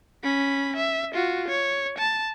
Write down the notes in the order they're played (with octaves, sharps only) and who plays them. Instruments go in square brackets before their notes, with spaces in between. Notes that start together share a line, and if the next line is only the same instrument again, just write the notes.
[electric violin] C#4 B5
E5
F4 F#4
C#5
A5